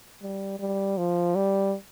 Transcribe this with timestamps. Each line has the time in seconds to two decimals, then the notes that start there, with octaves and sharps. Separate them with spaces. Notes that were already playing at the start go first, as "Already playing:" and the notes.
0.22 G3
0.60 G3
0.98 F3
1.36 G3